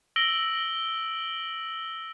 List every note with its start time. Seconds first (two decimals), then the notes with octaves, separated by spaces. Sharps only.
0.16 E6 A#6 D7 F#7 G7